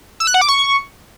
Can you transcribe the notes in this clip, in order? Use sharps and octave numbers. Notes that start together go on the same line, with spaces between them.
E6
F#6
F#5
D6
C#6